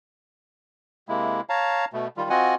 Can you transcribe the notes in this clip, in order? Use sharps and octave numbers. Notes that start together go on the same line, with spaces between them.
C3 G#3 A#3 E4
C#5 F5 A5 A#5
B2 A3
D#3 G3 F4
C4 F4 F#4 D#5 F#5 G#5